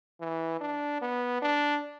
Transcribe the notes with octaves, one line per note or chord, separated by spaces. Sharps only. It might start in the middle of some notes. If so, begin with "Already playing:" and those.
E3
D4
B3
D4